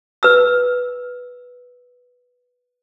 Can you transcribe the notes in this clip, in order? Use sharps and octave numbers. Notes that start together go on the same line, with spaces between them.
B4 E6